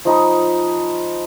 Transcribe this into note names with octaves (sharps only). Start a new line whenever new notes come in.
F3 D#4 B5 D#6